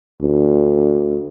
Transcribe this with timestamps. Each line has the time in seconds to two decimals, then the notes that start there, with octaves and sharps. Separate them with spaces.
0.22 D2